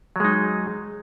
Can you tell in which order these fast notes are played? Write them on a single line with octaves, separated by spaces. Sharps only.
F#3 G#3 D#4